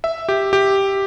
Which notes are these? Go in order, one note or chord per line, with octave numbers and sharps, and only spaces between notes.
E5
G4
G4